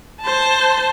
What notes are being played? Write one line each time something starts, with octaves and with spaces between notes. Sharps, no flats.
C5 A5